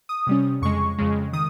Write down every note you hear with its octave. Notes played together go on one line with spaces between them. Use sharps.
D#6
C3 G3 C#4
F2 C#3 G#3 C#6
F2 C#3 G#3
D#3 D#6